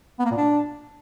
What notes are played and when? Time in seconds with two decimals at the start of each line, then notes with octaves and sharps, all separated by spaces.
0.19 B3
0.25 A#3
0.31 A#2
0.37 D4